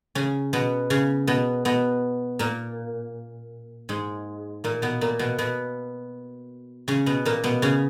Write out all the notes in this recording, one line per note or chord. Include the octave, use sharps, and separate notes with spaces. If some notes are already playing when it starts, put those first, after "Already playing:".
C#3 C#4
B2 B3
C#3 C#4
B2 B3
B2 B3
A#2 A#3
G#2 G#3
A#2 A#3
B2 B3
A#2 A#3
B2 B3
B2 B3
C#3 C#4
B2 B3
A#2 A#3
B2 B3
C#3 C#4